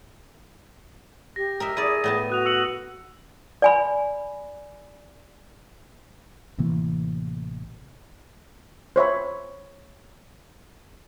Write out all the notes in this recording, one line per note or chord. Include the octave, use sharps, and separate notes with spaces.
G4 A#6
A#4 D#5 E5
E4 G#4 D5 D#7
A2 B3 A5 A#6
F#4 D#6 F#6 F7
E6 C#7 F#7
D5 G#5 B5
A1 C3 E3 A#3
C5 C#5 E5 B5